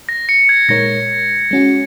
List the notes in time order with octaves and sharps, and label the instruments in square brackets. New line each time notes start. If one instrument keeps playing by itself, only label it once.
[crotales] A#6
C#7
G#6
[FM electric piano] A#2 G#3 D#4 A#4 C#5 [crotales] A#6
[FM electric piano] G#3 C#4 F#4